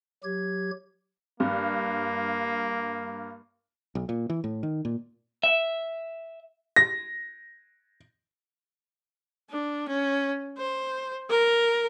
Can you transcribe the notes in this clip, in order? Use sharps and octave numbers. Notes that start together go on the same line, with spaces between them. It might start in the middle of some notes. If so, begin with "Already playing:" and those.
F#3 G4 G#6
G2 A#3
B1
A#2
E3
A2
D#3
A#2
E5
A#6
D4
C#4
C5
A#4